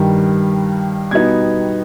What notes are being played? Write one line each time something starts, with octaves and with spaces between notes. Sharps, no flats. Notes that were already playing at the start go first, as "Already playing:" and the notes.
Already playing: G2 D#3 G3
B2 G3 B3 D#4 G#6